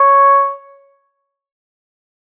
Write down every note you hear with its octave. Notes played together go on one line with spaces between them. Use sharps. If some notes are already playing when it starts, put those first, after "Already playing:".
Already playing: C#5